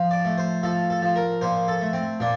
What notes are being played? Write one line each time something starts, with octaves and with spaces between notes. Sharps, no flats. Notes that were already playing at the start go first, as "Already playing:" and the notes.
Already playing: F3
D5
A3
C5
F3 A4
A4
F3
A#4
A#2 C5
A4
A3
C4
A#2 D4